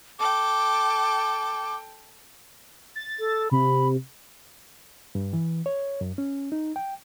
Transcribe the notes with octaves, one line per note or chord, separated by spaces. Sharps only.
A4 G5 D6
A6
A4
C3 B5
G2
E3
C#5
F#2
C#4
D#4
G5